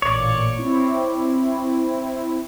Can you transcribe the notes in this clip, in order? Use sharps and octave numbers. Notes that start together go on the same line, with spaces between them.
A1 A#2 C#5 D5 C#7
C4 E4